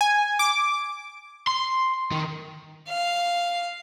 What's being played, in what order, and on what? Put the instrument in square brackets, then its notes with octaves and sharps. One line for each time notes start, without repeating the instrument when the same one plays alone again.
[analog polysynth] G#5
D6
[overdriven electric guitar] C6
D#3
[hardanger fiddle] F5